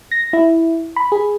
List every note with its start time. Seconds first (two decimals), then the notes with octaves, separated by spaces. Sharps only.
0.11 A#6
0.33 E4
0.96 B5
1.12 G#4